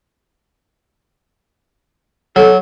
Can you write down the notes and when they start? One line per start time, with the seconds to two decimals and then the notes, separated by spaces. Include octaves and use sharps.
2.36 F#3 A4